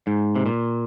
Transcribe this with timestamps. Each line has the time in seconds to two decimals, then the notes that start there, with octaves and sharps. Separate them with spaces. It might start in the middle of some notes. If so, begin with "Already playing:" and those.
0.07 G#2
0.36 C3
0.46 A#2